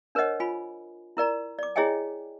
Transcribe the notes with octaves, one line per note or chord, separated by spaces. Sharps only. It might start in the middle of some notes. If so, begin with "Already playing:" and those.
D4 A#4 C5 C#5 D#5 F#5
F4 G#5 B5
E4 A#4 D5 A#5
D5 D6
E4 G#4 C#5 D#5 G5 G#5